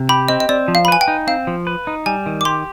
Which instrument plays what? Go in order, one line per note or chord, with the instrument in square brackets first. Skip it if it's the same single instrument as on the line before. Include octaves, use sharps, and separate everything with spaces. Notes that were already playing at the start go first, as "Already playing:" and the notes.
Already playing: [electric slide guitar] C3
[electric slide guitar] G4 [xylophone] B5
[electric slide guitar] C4 [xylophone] D#5
[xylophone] D#5
[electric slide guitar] C4 [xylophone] D5
[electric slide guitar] F3
[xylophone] F5
B5
[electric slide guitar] B4 [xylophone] G#5
[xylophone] G5
[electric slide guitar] D#4
[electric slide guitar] C4 [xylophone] F5
[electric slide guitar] F3
B4
D#4
[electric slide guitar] G3 [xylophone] G#5
[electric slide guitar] D#3
[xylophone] D6
[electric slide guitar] G4 [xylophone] C6